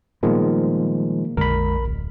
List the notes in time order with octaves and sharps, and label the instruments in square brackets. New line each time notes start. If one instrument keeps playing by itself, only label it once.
[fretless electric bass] A#2 G3 B3 [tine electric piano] D#3 F3 G#3 [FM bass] A#3
[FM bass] A#1 [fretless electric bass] F2 D3 G#3 [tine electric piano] A#4 B5
[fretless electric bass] D1